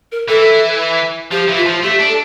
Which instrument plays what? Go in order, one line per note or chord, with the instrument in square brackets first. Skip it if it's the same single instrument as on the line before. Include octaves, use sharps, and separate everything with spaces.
[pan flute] A#4
[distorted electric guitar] E3 [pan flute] A4
[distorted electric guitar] F3 [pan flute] G4
[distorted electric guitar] E3
[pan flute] F4
[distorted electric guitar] F3
[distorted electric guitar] A3 [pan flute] G4
[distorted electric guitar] D4
[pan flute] A4